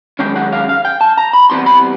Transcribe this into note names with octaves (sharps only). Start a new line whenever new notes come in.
F#2 D#3 G#3 C#4 G5
F#5
F5
F5
G5
A5
A#5
B5
C3 E3 G3 B3 C6
B5